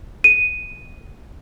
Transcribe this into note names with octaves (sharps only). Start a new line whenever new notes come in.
D#7